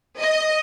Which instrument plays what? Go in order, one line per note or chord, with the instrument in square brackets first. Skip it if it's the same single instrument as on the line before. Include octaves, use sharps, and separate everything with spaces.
[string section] D#5